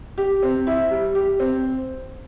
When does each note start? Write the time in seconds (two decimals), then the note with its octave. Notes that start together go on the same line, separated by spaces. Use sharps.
0.18 G4
0.43 C4
0.67 E4
0.91 G3
1.15 G4
1.40 C4